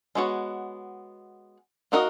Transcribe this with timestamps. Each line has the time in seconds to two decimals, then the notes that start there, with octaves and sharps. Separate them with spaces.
0.15 G#3 B3 F#4 C#5
1.92 A#3 D#4 F#4 A#4 D#5